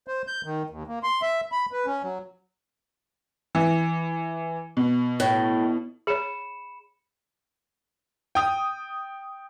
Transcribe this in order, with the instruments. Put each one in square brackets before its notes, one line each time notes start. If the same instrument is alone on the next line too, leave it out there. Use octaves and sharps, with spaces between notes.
[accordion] C5
G6
D#3
D#2
A#3
C6
E5
B5
B4
C#4
F#3
[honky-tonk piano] E3
B2
[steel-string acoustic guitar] A2
[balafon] G#4 C#5 [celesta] B5 C#7 E7
[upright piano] G5 D#6